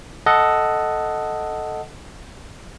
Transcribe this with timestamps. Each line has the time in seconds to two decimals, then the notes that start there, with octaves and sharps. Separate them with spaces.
0.26 A4 D#5 F#5